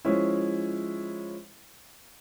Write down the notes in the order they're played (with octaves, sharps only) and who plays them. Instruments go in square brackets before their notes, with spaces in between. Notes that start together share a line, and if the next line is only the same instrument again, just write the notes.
[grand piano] F3 G#3 C#4 E4